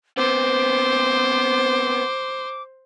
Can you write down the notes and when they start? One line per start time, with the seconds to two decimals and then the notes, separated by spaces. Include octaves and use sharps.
0.18 B3 C4 C5 D6